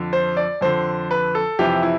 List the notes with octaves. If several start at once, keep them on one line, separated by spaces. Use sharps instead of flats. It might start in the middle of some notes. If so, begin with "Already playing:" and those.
Already playing: F2 D3
C5
D5
F2 D3 C5
B4
A4
F2 C3 E3 G4
E4